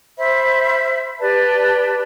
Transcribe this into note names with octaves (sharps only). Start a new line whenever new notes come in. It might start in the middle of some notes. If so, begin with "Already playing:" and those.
C5 E5 B5
G4 B4 D5 A5